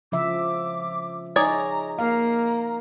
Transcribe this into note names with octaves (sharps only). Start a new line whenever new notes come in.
C#3 F3 E5 D6
D#4 G#4 C#5 D5 A#5
A#3 F5 A#5